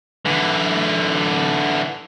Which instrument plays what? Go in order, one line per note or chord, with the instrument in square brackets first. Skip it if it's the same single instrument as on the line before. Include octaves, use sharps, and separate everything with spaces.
[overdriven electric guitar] D3 E3